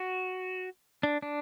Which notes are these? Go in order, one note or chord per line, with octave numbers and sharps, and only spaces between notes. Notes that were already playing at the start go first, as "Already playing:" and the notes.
Already playing: F#4
D4
D4